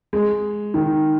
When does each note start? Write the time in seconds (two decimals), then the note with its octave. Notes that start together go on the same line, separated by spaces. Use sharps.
0.13 G#3
0.74 D#3